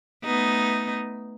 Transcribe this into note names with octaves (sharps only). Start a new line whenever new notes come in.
A3 B3 D#4